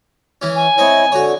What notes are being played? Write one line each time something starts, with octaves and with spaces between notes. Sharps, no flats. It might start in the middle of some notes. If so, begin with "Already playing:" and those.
E3 C#4
G#5
C4 E4 C#5 D#5
D3 F#4 C#5